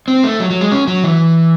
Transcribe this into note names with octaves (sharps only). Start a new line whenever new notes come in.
C4
A3
F#3
F#3
G#3
C#4
F#3
E3